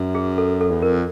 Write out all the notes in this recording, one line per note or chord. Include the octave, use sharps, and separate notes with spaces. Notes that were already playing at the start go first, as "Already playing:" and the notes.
Already playing: F#2
G#4
A4
A4
E2
F2 A#4